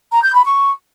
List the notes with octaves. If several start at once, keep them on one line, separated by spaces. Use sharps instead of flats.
A#5
G6
B5
C#6